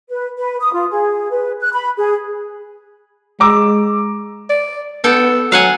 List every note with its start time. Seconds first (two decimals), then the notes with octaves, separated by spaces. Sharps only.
0.09 B4
0.37 B4
0.61 D#6
0.72 F4
0.90 G#4
1.31 B4
1.60 F#6
1.73 B5
1.98 G#4
3.40 G#3 A#5 D6 E6
4.49 D5
5.04 B3 A4 G5
5.52 F#3 F5 F#5 G#5